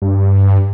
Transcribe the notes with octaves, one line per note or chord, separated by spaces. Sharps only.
G2